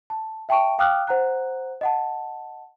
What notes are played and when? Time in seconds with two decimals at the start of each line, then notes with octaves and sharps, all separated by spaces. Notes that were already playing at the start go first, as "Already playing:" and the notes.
0.10 A5
0.49 E5 G5 A5 C#6 D7
0.79 F5 G5 D6 D#6 F6 F#6
1.07 C5 F#5 A#5 F#6
1.81 D#5 F#5 A5